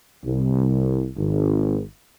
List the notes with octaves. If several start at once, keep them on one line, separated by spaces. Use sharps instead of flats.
C2
G#1